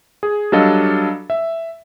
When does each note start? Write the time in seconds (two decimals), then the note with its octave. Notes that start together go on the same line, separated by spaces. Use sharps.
0.23 G#4
0.52 F#3 G3 D4 A4 D#5 F5
1.30 E5